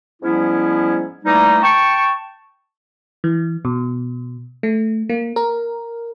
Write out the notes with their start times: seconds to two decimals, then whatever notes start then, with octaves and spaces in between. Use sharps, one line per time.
0.22 G#2 F3 G3 B3 C#4 E4
1.25 E3 G3 A3 A#3 D#4
1.62 G5 A5 C#6
3.24 E3
3.65 B2
4.63 A3
5.09 A#3
5.36 A#4